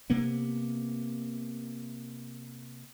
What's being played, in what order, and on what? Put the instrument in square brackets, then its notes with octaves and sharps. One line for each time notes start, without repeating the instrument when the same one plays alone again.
[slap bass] C3 A#3 B3